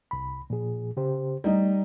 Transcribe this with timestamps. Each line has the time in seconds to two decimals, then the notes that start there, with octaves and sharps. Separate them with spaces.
0.11 C2 B5
0.50 A#2 F3 G#4
0.97 C#3 G4 C5
1.44 G3 A3 D#4 D#5